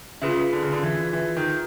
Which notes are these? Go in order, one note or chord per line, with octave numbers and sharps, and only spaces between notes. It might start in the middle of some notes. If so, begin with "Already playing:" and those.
C#3 F4 G#4 B4 E5
D3
C#3
D3
E3
E3
D#3